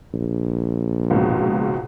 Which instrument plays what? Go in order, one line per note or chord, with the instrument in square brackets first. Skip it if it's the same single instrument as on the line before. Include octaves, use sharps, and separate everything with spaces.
[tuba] A#1
[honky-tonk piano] C#2 G#2 B2